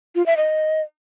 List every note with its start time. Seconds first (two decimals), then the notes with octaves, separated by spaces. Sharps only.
0.15 F4
0.26 E5
0.37 D#5